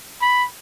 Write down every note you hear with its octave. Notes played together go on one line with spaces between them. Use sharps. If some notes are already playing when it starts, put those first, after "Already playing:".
B5